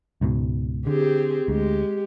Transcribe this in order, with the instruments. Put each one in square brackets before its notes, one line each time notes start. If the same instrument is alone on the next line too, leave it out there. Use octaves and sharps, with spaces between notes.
[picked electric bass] C#2 G#2 B2
[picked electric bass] D3 [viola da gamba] C4 G4 G#4
[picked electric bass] D2 [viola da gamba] G#3 G4